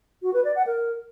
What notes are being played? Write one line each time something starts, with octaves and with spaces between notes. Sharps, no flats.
F#4
B4
D5
F#5
A#4